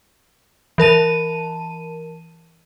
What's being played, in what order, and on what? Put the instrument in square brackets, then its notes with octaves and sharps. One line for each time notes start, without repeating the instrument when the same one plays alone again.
[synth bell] E3 A#4 A5 D#7